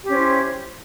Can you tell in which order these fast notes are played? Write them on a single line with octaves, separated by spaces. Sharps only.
G4 C#4 C5 E4